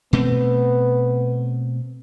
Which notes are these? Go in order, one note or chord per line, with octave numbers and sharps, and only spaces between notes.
B2 A3 B3 C4